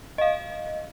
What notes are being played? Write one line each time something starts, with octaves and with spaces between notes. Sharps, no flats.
D#5 F5